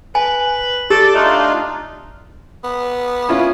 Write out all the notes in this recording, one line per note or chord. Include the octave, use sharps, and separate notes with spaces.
B4 G#5
G4 A4 D5 D6
A3 D4 D#4 F4
B3
C#4 E4 F4